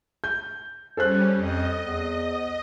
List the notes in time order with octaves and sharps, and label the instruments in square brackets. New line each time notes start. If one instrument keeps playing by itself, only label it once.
[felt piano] G6
[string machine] G3 C#4 [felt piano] A4 C5 F#6
[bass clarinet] F2 [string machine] D#5
[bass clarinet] E2